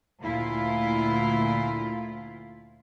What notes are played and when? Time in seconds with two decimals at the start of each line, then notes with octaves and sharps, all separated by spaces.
0.21 D2 A#2 E4 F4